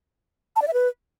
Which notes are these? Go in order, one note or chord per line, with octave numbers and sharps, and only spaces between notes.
A5
D5
E5
B4